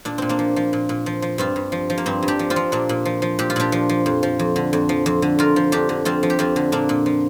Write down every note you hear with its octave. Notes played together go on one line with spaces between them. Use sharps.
A#2 D4
A#2 C4
A#3 D4
F3
F3
A#2
A#2
F3
F3
G2 C4 F4
G2
F3
F3
A#3
G2 C4
G2
D4 G4
F3
C4 F4
F3
A#2 A#3 D4
A#2
F3
F3
A#2 G4
F4
A#2 D4 G4
F3
F3
F2
F3
F2
D3
F2
F3
F2
D3
F2 F4 A#4
F3
F2 D4 G4
D3
F2 C4 F4
F3
G4
F2 C4 F4
D3
A#2 A#3 D4
A#2
F3